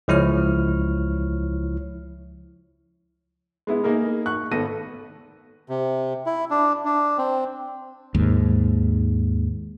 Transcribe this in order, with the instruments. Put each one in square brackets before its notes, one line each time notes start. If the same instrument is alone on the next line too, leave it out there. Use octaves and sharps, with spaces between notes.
[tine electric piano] C#2 F3 E4 C#5 F6
[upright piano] G#3 B3 E4
A#3 D#4 G#4 A#4
C#6 F#6
G#1 B3 A4 A#6 D#7
[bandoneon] C3
E4
D4
D4
C4
[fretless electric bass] D#2 G#2